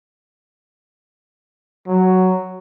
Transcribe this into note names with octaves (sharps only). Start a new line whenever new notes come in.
F#3